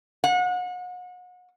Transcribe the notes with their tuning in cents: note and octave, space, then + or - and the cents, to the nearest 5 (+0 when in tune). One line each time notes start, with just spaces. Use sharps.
F#5 -35